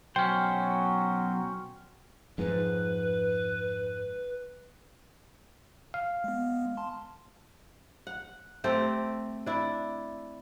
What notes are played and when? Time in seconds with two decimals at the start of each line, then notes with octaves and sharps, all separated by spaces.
0.16 B1 F#3 C#4 C5 G5
2.38 F2 G#2 B4
5.94 F5
6.24 G#3 B3
6.77 A5 C6
8.07 F#5
8.64 A3 C4 G4 A4
9.46 D4 E4